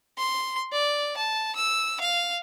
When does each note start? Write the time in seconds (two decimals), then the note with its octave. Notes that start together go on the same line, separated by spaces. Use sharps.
0.18 C6
0.72 D5
1.17 A5
1.55 E6
2.01 F5